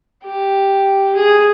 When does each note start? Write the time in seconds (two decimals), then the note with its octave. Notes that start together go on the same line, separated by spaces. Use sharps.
0.25 G4
1.15 G#4